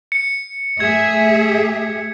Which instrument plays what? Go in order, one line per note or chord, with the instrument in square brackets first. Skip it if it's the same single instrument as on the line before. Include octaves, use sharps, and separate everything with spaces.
[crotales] C#7
[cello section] A3 G#4 E5 [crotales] G#6